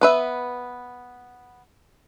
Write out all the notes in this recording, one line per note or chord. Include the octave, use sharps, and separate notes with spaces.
B3 B4 E5